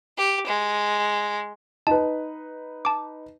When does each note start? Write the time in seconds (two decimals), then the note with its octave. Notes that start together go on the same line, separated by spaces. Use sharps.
0.17 G4
0.47 G#3
1.87 D#4 B4 A5
2.85 A5 D6